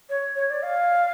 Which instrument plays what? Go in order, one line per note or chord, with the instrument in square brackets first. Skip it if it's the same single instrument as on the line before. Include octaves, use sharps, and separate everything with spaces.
[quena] C#5
C#5
D5
F5